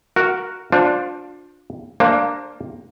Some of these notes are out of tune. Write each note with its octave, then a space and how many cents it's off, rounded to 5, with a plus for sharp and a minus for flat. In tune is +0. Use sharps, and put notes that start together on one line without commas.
F#4 +0 A#4 +0
D4 +0 F4 +30 C5 +0
A#3 +0 D4 +5 C5 +30